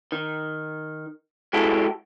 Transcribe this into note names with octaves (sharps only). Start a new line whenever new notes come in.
D#3
G#3 E4 F#4 G4 A4